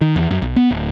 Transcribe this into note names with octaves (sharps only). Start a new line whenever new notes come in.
D#3
E2
F#2
B1
B3
D1